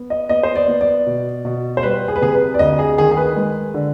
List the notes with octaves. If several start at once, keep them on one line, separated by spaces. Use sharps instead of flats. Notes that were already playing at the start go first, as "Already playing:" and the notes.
Already playing: B3
D#5
B3 D#5
C5
D5
B3
D5
B2
B2
C5
G3 B4
G#4
B4
C3 G#4
B4
D5
D2 D#5
G#4
D#3 G#4
G#4
B4
G#3
D3